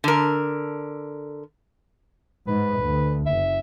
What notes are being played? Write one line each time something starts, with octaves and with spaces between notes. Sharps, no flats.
D3 A#4
G#2 B4
D2
F#1 E5